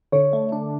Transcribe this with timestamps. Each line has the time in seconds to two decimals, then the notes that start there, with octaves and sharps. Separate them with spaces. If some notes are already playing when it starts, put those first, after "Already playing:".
0.12 D3 C#5
0.33 A3
0.52 D4